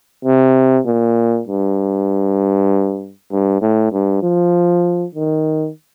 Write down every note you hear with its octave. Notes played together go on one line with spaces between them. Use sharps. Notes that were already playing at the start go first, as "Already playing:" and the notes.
C3
A#2
G2
G2
A2
G2
F3
D#3